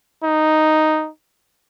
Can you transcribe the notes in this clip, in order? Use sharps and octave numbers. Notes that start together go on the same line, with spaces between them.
D#4